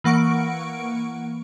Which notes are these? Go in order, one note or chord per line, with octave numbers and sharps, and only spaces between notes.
E3 A#3 F#5 C#6 D7